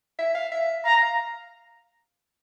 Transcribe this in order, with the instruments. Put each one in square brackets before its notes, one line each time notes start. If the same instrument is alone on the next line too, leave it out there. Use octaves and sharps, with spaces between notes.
[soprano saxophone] E5
F5
E5
[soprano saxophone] F5 [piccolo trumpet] A#5
[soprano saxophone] F5